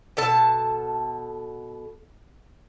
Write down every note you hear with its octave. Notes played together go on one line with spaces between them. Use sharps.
B2 A4 A5